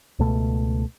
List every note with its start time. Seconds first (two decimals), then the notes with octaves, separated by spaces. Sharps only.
0.19 C#2 B2 A3